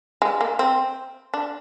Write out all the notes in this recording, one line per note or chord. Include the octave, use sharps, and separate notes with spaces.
G#3
A#3
C4
D4